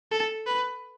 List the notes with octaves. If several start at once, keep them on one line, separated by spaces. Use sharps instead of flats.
A4
B4